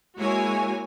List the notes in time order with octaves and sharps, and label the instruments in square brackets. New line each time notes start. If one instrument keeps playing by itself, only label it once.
[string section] G#3 A#3 E4 F#4 C#5 G#5